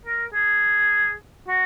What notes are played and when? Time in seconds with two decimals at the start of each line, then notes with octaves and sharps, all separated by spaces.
0.05 A#4
0.34 G#4
1.48 F#4